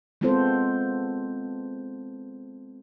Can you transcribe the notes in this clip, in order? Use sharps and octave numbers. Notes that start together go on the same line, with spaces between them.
G#3 B3 C4 F4 A4 C5